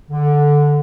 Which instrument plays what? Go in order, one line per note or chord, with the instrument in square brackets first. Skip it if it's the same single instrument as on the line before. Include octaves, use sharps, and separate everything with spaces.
[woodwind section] D3